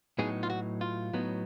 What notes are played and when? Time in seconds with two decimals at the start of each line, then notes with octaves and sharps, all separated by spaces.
0.18 A2 F#3 B3 D#4 G#4
0.43 F4
0.50 F#4
0.81 F4
1.13 A2 F#3 B3 D#4